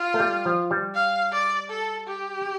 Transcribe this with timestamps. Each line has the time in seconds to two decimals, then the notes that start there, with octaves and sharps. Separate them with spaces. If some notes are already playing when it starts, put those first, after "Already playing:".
Already playing: F4
0.14 A3
0.20 G3
0.45 F3
0.71 G3
0.95 F5
1.33 D5
1.70 A4
2.07 G4